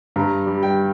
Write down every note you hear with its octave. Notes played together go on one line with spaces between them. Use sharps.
G2 A#5
G3
G5